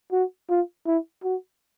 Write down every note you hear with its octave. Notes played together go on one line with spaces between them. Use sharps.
F#4
F4
E4
F#4